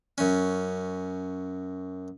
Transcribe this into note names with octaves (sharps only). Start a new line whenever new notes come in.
F#2 C#4